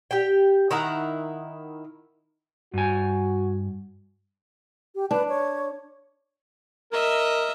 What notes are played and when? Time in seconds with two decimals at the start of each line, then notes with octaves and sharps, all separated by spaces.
0.11 G4 G5
0.71 D#3 E4 F#5 A#5
2.74 G2 F#4 G#5
4.95 G4
5.11 D4 B4
5.28 C#5
6.92 A#4 D#5 E5